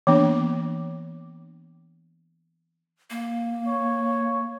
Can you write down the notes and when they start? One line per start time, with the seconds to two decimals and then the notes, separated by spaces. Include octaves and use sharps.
0.07 E3 A#3 B3 D4
3.10 A#3
3.67 C#5